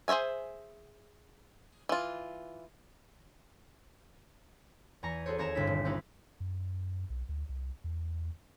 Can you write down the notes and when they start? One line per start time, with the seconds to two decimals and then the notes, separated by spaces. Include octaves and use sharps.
0.08 G#4 C5 C#5 E5 G#5
1.89 E3 F4
5.03 E2 G#5 A#5 C#6 A#6
5.26 F#4 G#4 A4 C5 C#5
5.38 D#2 C4 C#5 A#5 G#6 E7
5.55 G1 C4 D4 E4 B6
5.67 D#1
5.84 G3 C4 C#4 D#4 E4 F#4
6.40 F#2
7.10 B1
7.29 D2
7.49 C2
7.84 E2